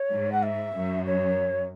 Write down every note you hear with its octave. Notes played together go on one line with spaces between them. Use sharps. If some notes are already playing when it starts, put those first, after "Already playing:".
Already playing: C#5
G#2
F#5
E5
F#2
C#5